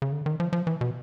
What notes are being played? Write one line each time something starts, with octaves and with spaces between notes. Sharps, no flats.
C#3
D3
D#3
F3
F3
E3
B2